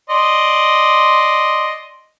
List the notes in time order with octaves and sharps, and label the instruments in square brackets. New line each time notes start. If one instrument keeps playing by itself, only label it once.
[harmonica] D5 D#5 C6